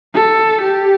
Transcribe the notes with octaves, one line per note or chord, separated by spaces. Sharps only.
A4
G4